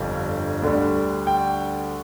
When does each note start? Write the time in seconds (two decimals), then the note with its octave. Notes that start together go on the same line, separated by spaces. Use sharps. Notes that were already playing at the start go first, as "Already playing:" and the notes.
Already playing: G1 F2 D3 G3
0.62 D2 D3 G3
1.27 G5